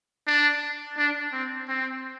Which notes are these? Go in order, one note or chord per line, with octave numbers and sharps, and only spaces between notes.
D4
D4
C4
C4